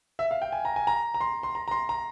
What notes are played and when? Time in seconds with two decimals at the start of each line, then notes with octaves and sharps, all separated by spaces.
0.19 E5
0.31 F5
0.42 G5
0.52 G#5
0.65 A#5
0.76 G#5
0.87 A#5
1.14 A#5
1.21 C6
1.43 C6
1.55 A#5
1.68 A#5
1.71 C6
1.89 A#5